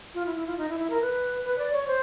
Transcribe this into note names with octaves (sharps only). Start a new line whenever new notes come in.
F4
E4
E4
F4
D#4
E4
E4
A#4
B4
B4
D5
C#5
C5